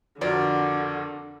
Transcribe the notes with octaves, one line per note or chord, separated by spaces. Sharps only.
F2 D3 B3 F#4 A#4 D5